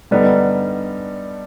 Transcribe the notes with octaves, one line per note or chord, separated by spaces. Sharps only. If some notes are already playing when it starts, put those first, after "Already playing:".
G2 D3 G3 B3 D#4